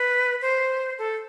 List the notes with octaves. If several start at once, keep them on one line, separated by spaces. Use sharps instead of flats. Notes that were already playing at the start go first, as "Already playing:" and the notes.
Already playing: B4
C5
A4